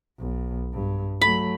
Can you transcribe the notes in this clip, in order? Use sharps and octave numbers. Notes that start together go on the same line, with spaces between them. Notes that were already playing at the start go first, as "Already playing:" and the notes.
B1
G2
F#3 A3 B5